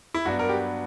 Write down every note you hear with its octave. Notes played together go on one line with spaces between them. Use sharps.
E4
G2 F#3 B3 D4 F#4
A#4
G4